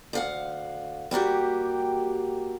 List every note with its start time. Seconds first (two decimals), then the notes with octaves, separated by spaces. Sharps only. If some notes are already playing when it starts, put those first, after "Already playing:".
0.13 D2 F5 F#5
1.11 G3 A#3 F#4 G4